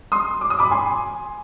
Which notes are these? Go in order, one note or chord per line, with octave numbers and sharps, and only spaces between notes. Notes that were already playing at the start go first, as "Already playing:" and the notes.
C6 D#6
D6
D#6
B5 D6
G#5 C6